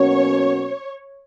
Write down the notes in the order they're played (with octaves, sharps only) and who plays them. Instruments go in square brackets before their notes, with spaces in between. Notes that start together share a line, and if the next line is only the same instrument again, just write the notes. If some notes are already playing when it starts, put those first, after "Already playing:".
Already playing: [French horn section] B2 F#3 A#3 C#4 F#4 [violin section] C#5